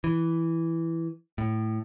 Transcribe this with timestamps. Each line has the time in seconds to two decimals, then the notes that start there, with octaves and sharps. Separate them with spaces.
0.04 E3
1.38 A2